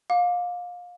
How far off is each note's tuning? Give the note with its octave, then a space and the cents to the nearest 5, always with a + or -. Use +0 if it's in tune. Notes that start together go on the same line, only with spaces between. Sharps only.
F5 +25 D6 -10